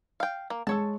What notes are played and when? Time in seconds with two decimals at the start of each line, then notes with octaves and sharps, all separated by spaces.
0.20 F5 G5
0.50 A#3
0.67 G#3 A4 C#5 A5